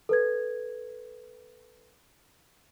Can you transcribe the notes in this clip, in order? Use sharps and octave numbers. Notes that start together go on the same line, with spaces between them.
A4 B4 G#6